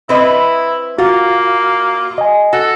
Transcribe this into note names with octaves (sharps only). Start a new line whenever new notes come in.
C4 E4 B4 D#5
A#3 F4 F#4
D#5 G#5
F#4 A4